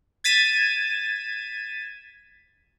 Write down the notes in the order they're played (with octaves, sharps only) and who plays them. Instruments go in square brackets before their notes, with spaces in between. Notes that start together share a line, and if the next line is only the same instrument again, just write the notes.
[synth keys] G#6 A6 B6 D#7 E7